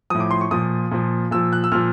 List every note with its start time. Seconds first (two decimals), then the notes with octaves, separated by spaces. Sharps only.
0.10 A2 F3 D#6
0.20 D6
0.31 C6
0.41 C#6
0.51 A#2 F3 D#6
0.91 A#2 F3
1.31 A#2 F3 E6
1.53 F#6
1.64 E6
1.72 A#2 F3 F6